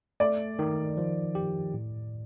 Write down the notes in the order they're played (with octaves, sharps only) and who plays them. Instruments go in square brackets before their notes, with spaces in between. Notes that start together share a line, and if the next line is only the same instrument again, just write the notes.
[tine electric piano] A3 [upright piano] D5
[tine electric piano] D#3
F3
G4
A2